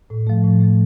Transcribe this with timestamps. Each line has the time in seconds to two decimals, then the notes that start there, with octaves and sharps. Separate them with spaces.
0.10 A2
0.27 F3 A3
0.44 A2
0.61 F3 A3